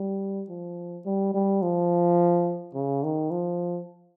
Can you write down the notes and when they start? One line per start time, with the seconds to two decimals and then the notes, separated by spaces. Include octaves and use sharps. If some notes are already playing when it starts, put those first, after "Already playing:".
Already playing: G3
0.49 F3
1.05 G3
1.34 G3
1.62 F3
2.74 C#3
3.03 D#3
3.31 F3